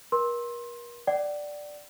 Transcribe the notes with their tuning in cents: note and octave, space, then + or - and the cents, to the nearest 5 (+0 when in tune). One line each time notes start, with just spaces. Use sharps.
A#4 +40 C6 +20
D5 +0 F#5 +45